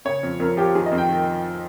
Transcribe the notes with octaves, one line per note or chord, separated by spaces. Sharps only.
C#3 C#5
F2
F2 A#4
F3 G4
D#3 G#4
D#5
F2
G5
D#3